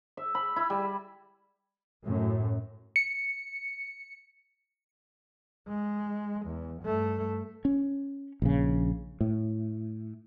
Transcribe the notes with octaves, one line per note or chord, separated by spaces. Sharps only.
E5
B5
E4
G3
F#2 A2
C#7
G#3
E2
G2 A3
C#4
A#1 C#3
A2